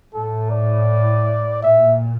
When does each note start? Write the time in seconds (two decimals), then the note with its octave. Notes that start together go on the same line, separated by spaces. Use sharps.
0.14 A2 A4
0.50 D5
1.62 A#2 E5